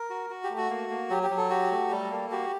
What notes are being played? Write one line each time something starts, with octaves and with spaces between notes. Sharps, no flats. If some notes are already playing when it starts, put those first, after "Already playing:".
Already playing: A#4
F#4
F#4
G4
A3
F#4
A#3
A#3
F#3 G4
G4
F#3
A4
F#4 G4
A3
G3 A4
A#3
F#4 G4